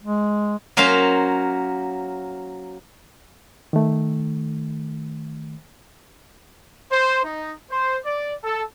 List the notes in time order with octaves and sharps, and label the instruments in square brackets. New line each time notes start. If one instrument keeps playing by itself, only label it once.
[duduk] G#3
[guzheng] F#3 A#3 C#4 C5 F5
[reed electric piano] D#3 A3
[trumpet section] C5
D#4
C5
D5
A4